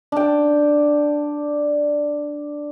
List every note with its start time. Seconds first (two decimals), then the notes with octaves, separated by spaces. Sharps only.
0.12 D4 G5